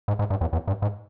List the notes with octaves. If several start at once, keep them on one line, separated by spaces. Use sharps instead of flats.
G#2
G#2
G2
E2
E2
G2
G#2